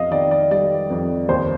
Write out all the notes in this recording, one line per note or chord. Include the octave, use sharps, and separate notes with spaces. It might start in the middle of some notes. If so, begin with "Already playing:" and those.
Already playing: F2 D#5 F5
D#3 D5
D5
G3 D5
F2
D#2 C5